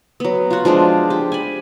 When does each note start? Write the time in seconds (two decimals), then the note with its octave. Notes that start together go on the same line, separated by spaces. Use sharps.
0.20 F#3 B3
0.51 F4 F#4
0.65 F3 G#3 D4 F4
1.10 G4
1.32 G#5 B5